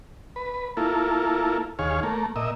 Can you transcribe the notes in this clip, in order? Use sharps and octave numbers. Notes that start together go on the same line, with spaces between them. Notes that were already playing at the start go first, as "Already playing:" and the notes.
B4
A#3 E4 F4 A4
D#2 G#4 C#5 F5
A3 A#3
A#2 D#5 E5